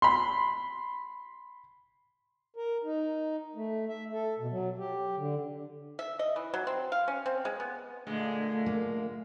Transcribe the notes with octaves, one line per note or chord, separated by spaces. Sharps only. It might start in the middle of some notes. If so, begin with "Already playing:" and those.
B5 C6
A#4
D#4
A3
E5
A4
B2
F#3
G4
D3
E5
D#5
E3
F#3
C4
F5
C#4
C4
G#3
B3
A#2 D3 G#3 A3
A#3